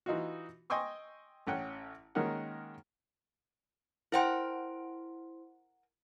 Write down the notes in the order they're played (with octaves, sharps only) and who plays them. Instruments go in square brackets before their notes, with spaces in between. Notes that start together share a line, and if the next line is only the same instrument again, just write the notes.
[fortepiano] E3 D#4 F4 F#4
D#5 G5 G#5 C6 C#6 E6
A1 C#4 F#5 G5
D#3 G#3 A#3 C#4 A#4 F#5
[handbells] E4 C5 C6 [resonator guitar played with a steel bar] A#4 F#5 G5